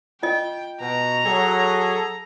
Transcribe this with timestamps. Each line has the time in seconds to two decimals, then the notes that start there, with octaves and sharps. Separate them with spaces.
0.23 F4 D#5 G5
0.81 B2 A#5
1.25 F#3 G#4 A4